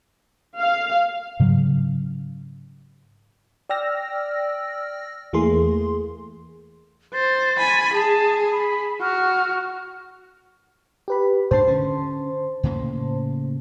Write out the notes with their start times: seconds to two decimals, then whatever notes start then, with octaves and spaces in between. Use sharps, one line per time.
0.58 F5
1.40 G#2 C#3 F#3
3.70 D5 G5 E6 F6 A#6
5.33 E2 E3 A3 A#3 G#4 C6
7.14 C5 A6
7.58 G#5 B5
7.94 G#4 A5
8.52 B5
9.01 F#4 F6
11.08 G4 B4 B5
11.51 G#2 D4 C5 A5 C6
11.68 D3 C#4
12.63 A2 C#3 A#3